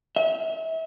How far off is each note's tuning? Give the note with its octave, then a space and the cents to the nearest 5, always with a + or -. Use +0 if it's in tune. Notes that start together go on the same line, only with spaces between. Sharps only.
E5 -30